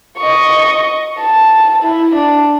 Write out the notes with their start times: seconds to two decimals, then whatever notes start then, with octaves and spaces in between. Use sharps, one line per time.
0.18 D#5 C#6
1.18 A5
1.82 E4
2.15 D4